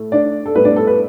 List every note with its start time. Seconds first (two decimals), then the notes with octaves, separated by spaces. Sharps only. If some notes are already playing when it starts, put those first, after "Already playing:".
Already playing: A2 A3
0.12 D4 D5
0.46 A4
0.55 A2 G3 B3 B4
0.65 D4 D5
0.76 A4
0.87 B4